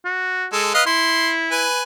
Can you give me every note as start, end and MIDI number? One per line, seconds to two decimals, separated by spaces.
0.05 0.47 66
0.52 0.73 56
0.52 0.73 69
0.74 0.85 71
0.74 0.82 75
0.74 0.82 77
0.86 1.66 64
0.86 1.30 84
1.51 1.83 71
1.51 1.83 80